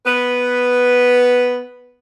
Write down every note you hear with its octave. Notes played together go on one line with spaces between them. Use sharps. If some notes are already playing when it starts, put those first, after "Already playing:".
B3 B4